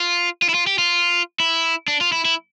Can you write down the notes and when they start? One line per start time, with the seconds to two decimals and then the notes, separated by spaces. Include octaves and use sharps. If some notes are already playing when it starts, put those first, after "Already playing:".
Already playing: F4
0.42 F4
0.49 E4
0.54 F4
0.67 G4
0.79 F4
1.40 E4
1.88 D4
2.01 F4
2.12 E4
2.25 E4